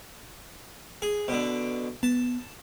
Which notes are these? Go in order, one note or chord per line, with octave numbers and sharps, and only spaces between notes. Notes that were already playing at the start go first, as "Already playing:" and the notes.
G#4
B2 D3
B3 A5